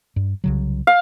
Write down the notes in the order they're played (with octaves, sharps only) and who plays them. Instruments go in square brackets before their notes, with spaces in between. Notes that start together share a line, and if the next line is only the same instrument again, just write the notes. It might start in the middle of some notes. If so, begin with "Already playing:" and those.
[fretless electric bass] G2
C2 C#3 F#3
[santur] F5